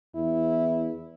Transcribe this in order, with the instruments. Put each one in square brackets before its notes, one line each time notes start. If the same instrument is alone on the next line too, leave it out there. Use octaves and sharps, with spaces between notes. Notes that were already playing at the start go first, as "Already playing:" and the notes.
[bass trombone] E2 [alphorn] E4